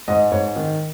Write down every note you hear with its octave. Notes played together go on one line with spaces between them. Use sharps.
G#2 D#5
G#2 C#5
D#3